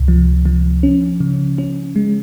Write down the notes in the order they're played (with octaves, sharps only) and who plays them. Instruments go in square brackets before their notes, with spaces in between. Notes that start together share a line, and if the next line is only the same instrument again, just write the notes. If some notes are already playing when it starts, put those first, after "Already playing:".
Already playing: [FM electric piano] C#2 C3
F3
F3
C#4
C#3
C#4
G#3